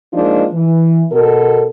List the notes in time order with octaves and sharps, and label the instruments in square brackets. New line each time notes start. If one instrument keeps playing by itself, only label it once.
[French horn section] F3 G#3 A#3 D4 D#4 F4
E3
B2 A4 A#4